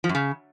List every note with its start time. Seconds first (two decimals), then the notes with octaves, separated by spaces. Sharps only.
0.04 F3
0.09 F#2
0.15 C#3